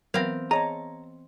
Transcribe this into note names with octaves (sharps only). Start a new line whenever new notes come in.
E3 F#3 B3 C4 A#4 B4 F5 A#6
G#4 C#5 D#5 A5 A#5